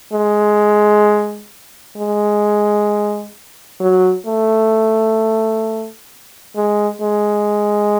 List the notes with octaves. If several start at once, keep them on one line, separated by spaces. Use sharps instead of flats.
G#3
G#3
F#3
A3
G#3
G#3